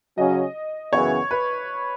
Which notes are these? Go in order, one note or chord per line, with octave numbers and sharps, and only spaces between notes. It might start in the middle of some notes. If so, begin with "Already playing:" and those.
C#3 F#3 C#4 D#5
F#2 C#3 E3 B3 C#5
B4